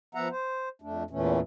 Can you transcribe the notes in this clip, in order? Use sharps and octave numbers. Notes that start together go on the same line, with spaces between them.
F3 B3 E5 F#5 A#5
C5
F2 A3 D4
E2 A#2 E3 A3 C#4